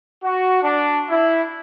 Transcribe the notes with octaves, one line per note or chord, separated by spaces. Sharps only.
F#4
D4
E4